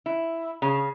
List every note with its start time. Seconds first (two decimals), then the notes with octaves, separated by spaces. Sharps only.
0.06 E4
0.62 C#3